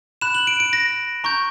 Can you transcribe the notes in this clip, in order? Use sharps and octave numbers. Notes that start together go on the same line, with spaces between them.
B5 F#6 E7
F#7
D7
D7
A#6
A#5 C#6 G6